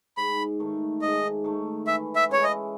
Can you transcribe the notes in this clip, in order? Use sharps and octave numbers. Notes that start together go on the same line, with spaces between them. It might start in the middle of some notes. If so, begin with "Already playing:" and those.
G#2 B5
D#3 A3
G#2 D#5
D#3 A3
E3 E5
E5
G#3 C#4 E4 C#5
D#5